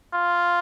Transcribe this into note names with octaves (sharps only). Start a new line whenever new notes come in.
F4